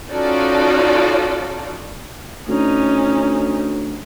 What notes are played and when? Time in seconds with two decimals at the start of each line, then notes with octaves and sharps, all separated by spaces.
0.11 C#4 D#4 F4 F#4 A4 D5
2.49 D2 C#4 D#4